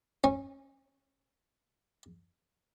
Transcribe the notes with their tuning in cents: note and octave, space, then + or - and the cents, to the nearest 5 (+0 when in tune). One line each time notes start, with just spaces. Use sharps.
C#4 -20